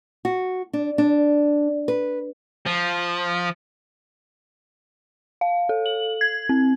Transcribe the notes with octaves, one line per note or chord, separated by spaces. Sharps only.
F#4
D4
D4
B4
F3
F5
A4
F#7
G#6
C4